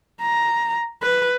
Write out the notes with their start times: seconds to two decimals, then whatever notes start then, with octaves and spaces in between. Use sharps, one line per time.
0.22 A#5
1.03 B4